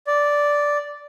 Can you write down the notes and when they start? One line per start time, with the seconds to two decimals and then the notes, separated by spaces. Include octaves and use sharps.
0.07 D5